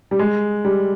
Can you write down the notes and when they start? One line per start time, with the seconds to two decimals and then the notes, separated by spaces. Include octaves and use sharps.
0.11 G3
0.19 G#3
0.65 G3